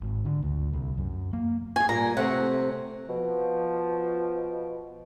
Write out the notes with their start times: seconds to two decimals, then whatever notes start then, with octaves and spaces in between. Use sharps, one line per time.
0.01 G#1
0.25 D3
0.42 D2
0.73 C2
0.98 F#2
1.33 A#3
1.76 F#4 G#4 G#5
1.89 A#2 G3 A#5
2.17 C3 A3 C4 F#5
3.09 B2 F3